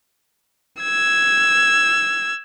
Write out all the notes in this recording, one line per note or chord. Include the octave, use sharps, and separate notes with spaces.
E6 G#6